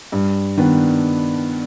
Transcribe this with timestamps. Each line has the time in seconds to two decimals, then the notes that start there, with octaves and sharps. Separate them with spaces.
0.12 G2
0.57 D#3 B3 D4